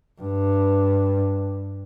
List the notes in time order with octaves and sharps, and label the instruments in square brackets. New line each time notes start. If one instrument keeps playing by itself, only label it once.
[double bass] G2